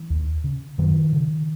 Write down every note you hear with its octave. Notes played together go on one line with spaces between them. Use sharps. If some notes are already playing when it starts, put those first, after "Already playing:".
Already playing: E3
D#2
C#3
F#2 D#3 F3
C#3